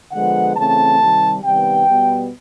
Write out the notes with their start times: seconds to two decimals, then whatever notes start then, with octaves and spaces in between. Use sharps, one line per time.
0.12 D3 F3 G#3 B3 F#5
0.56 C#3 E3 A3 C4 A5
1.00 C3 D#3 G3
1.43 C3 D#3 G3 B3 G5
1.87 B2 G3 B3